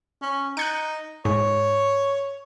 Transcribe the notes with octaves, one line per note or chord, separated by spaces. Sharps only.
C#4
D#4 F#6 G6 C#7
G#2 C#5